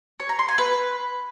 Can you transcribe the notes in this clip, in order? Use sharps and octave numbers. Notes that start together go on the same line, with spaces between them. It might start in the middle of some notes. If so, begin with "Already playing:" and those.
C#5
A#5
C6
G#5
B4